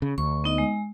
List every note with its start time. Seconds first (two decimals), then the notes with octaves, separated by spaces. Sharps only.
0.02 C#3
0.18 D2 C#6
0.44 B3 D#4 D#5
0.58 G#3